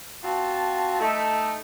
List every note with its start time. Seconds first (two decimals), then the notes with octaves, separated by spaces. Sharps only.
0.22 C4 F4 F#4 A5
0.99 A3 D#4